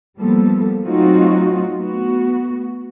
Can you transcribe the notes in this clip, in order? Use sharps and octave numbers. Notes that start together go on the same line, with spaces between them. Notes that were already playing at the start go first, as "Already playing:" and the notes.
F3 G3 A#3 B3 A4
F#3 A3 C4 D#4 F4 F#4
A3 B3 F#4